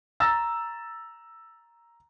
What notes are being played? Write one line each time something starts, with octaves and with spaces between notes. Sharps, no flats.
A#5 E6 A6 A#6